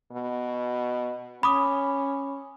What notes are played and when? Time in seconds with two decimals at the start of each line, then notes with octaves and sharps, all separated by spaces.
0.12 B2
1.43 C#4 B5 D6 D#6